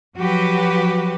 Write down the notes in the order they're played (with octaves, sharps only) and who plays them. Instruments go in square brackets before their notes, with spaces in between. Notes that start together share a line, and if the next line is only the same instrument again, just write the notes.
[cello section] F3 F#3 F#4 G4 B4